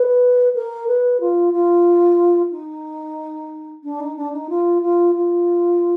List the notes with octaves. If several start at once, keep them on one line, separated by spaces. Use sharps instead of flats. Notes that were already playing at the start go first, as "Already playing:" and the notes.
Already playing: B4
A#4
B4
F4
F4
D#4
D4
D#4
D4
D#4
F4
F4
F4